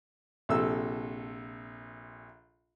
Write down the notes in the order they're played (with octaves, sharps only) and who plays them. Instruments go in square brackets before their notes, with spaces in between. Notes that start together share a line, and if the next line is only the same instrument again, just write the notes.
[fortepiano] A#1 C3 A4 E6